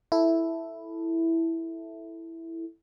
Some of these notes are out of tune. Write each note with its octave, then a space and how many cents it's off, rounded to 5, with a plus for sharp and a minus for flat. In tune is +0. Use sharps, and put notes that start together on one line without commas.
E4 +0 A4 +0